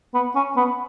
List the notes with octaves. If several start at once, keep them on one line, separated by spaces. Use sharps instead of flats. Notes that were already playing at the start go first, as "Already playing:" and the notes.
B3
C#4
B3